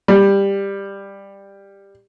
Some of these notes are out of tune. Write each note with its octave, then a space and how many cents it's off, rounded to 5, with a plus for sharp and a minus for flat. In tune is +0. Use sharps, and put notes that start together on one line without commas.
G3 +15